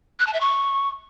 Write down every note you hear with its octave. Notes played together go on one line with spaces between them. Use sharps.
F#6
A5
E5
C#6